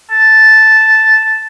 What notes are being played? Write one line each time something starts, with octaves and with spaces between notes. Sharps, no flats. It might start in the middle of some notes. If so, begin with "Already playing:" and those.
A5